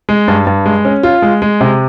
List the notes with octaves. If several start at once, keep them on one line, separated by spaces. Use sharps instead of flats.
G#3
G2
G2
G#3
C#4
F4
G#3
G#3
C3